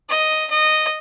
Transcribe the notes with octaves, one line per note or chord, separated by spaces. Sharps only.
D#5
D#5